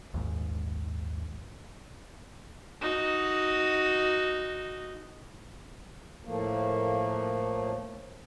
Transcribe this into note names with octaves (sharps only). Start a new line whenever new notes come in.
A#1 D#2 G#2
D#4 F#4
A2 F3 A3 A#3